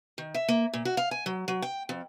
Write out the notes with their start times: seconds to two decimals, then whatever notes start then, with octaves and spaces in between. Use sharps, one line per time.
0.18 D#3
0.34 E5
0.49 A#3
0.73 A#2
0.85 F#4
0.97 F5
1.11 G#5
1.26 F#3
1.48 F#3
1.62 G5
1.89 F2